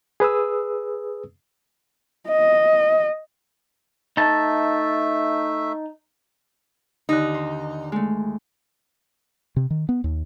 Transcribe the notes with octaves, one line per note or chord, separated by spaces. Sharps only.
G#4 B4 D#6 E6
D#5
A3 D#4 E5 A5
D#2 D3 D#4 F#6
C5
G#3 A3
C3
D#3
B3
D#2